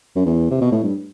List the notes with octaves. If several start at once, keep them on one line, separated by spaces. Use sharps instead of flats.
F#2
E2
C3
B2
A2
G2